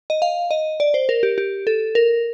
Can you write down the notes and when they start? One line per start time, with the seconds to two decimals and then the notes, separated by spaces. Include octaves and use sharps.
0.10 D#5
0.22 F5
0.51 D#5
0.80 D5
0.94 C5
1.09 A#4
1.23 G4
1.38 G4
1.67 A4
1.95 A#4